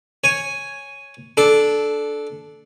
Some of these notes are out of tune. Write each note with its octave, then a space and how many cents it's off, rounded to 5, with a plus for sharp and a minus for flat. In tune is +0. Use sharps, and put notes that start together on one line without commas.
C#5 +0 G#5 +0
D4 +0 A4 -15